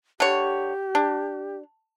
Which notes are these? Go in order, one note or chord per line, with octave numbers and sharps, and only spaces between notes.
D3 G4 C#5
D4